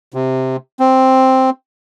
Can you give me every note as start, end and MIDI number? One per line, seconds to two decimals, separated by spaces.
0.14 0.57 48
0.80 1.50 60